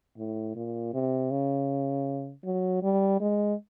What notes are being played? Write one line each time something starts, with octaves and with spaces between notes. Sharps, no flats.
A2
A#2
C3
C#3
F#3
G3
G#3